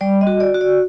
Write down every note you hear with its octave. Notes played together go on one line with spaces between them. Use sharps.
G3 D5
D#5
F#4
D5
F#4
D5